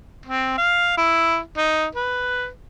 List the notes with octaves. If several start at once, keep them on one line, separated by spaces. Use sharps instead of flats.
C4
F5
E4
D#4
B4